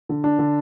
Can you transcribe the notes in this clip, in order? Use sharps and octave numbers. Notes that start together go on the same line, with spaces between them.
D3
D4
D3